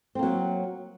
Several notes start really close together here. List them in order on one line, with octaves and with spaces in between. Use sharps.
C4 A#3 F#3